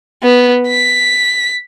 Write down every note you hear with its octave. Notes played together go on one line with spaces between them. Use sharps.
B3
B6